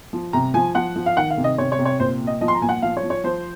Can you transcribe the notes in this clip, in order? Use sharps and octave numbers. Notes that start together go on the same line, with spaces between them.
F3
C3 A#5
F3 G#5
F3 F#5
F3
F5
D#3 F#5
F5
C3
D#5
C3 C#5
C#5
C3
C#5
A#2 C5
A#2
D#5
F3 D#5
C6
A#5
A#2 G#5
F#5
F3 F5
C#5
F3
C#5
F3 C5